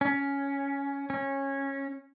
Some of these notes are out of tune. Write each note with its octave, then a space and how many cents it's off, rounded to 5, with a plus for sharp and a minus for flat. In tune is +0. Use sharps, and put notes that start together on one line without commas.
C#4 +10
C#4 -15